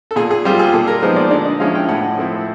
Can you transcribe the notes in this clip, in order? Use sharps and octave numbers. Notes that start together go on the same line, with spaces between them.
A4
A#2 G#4
G#4
G3 C4 F4 G4
G#4
A#2 A4
A#4
F3 G#3 B3 D#4 C5
D5
D3 D5
D#5
F3 G#3 C#4 E4 F5
G5
A2 F#5
F3 A3 C4 E4